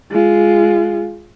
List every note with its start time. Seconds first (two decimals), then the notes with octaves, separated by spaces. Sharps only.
0.11 G#3 F4